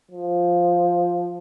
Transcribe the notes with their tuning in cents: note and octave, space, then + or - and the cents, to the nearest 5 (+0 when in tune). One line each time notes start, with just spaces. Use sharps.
F3 +5